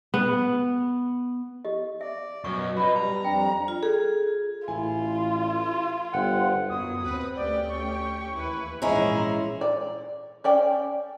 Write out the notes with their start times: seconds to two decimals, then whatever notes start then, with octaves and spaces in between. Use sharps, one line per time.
0.14 B3
1.65 G4 D#5
2.01 D5 E5
2.44 F#2 B2 C#6
2.77 F#4 B4 D#5 B5
2.96 G3 A#5
3.24 F2 G3 D4 G5
3.68 F4
3.83 G#4 A4
4.68 A1 E4 F4 G#5
6.13 G1 C5 F#5 G5
6.69 F#2 F#3 B3 D#6
7.03 D#2 C4 B4
7.36 D2 A3 C#4 G4 D5 G5
7.69 C#6
8.33 D#2 E3 E4 B4
8.82 A#1 G#2 E3 G#3 C#4 E4 F4 A#5
9.61 D5
10.44 C#4 D5 G5